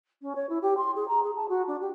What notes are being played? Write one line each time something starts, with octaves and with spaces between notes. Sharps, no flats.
C#4
C#5
E4
G4
C6
G#4
A#5
G#4
A5
F#4
D4
G4